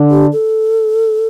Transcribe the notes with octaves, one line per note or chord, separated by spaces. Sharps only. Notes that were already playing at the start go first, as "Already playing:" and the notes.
Already playing: D3 D4
G4
A4